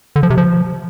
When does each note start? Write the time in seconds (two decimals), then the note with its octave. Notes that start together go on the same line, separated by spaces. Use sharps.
0.16 D3
0.23 F3
0.30 C3
0.38 F3